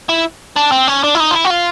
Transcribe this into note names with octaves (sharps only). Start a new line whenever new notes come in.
E4
D4
C4
C#4
D4
E4
D#4
F4
E4
F#4
F4